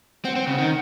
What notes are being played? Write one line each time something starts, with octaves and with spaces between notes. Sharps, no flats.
C4 F#5
C4
C#3
D#3